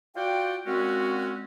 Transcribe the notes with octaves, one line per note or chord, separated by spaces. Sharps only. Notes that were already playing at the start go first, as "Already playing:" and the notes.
F4 F#4 D5 F#5 G5
A#2 G#3 C4 C#4 F#4